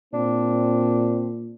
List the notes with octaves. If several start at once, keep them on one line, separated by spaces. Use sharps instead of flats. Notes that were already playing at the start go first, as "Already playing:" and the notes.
A#2 C4 D4